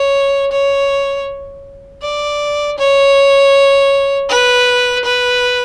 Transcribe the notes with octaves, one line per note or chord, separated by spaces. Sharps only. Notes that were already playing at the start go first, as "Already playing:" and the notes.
Already playing: C#5
C#5
D5
C#5
B4
B4